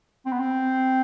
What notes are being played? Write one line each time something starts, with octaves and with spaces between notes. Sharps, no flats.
C4
B3
C4